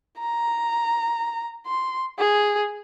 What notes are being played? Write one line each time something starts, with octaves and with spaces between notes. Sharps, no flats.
A#5
C6
G#4